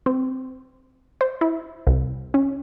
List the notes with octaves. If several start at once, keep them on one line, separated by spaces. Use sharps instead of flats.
C4
C5
E4
C2
C#4